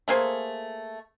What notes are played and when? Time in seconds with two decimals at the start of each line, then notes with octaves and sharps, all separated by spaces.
0.08 A3 A#3 G#4 C5